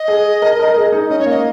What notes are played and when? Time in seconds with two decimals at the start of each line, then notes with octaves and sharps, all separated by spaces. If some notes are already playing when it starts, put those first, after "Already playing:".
Already playing: D#5
0.08 G#4
0.42 A#4
0.59 A#4
0.76 G#4
0.92 D#4
1.10 C#4 D#5
1.19 C#5
1.26 A#3 D#5